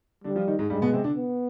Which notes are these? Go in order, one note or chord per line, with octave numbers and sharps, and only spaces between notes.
D3 G3 D4
F3 F4
D#3 D#4
G#2 G#3
G2 G3 G#3
B2 B3
C3 C4
D3 D4
B3